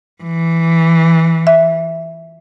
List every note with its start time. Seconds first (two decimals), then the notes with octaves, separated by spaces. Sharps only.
0.23 E3
1.47 E5